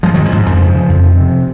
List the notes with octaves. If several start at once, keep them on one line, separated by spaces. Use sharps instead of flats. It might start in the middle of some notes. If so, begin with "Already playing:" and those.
G#2 F3 G#3
D#3 F#3
G#2
F3
G#2
F2 F3
C#3
C#3
F2
C3
C3